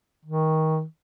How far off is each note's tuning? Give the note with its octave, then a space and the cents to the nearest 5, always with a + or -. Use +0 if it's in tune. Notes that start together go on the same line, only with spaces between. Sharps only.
D#3 +20